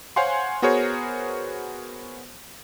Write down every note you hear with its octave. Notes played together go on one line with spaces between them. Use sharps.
C5 C#5 F5 F#5 G#5 C6
B3 F#4 G#4 A#4 C5 C#5